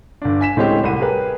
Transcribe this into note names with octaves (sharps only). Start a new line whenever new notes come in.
G1 D4
G#5 B6 E7
D1 A2 G#3 C4 C#4 G4
C2 F#5 D#7
G4 G#4 A#4 B4